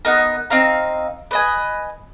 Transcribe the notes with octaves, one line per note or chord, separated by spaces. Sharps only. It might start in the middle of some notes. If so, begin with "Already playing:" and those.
B3 D#4 A#4
C4 D#4 F5 A#5
B4 D#5 G#5